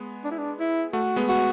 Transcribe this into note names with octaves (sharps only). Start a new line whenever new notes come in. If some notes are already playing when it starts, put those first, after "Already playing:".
Already playing: G#3 B3
D4
E4
D4
E4
A3 F#4
G#3 B3
F#4